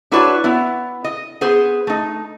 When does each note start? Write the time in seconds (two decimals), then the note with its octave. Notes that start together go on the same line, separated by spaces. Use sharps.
0.12 D4 E4 F#4 B4 C#5 D5
0.44 B3 E4
1.04 D#5
1.41 B3 G#4 C5
1.87 A3 D#4